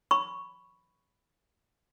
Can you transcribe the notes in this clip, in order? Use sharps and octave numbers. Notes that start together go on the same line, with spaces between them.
B5 C#6